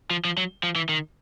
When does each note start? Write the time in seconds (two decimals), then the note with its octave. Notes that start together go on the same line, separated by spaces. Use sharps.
0.11 F3
0.25 F3
0.37 F#3
0.63 F3
0.76 E3
0.89 D#3